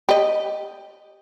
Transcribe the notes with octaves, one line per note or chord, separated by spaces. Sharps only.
G4 D#5